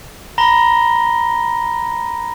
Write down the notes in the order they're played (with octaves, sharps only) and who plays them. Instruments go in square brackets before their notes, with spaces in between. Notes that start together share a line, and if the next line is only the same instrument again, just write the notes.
[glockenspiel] A#5 B5 A#6 G7